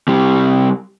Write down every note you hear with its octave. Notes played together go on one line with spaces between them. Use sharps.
C3 G3